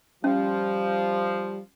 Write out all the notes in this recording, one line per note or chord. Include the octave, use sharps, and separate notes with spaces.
F3 G3 C#4